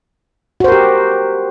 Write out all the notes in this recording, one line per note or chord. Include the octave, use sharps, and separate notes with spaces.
F#4 G4 A#4 C5